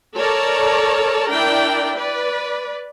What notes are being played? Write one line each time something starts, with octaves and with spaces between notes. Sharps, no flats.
A4 A#4 C#5 D5 A5 A#5
D4 E4 A#4 D5 G5
B4 D5